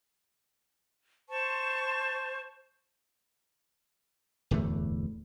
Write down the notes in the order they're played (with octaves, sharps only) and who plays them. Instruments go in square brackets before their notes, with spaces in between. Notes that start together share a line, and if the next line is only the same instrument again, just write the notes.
[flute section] C5 A5 C#6
[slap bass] D1 E2 G2 A3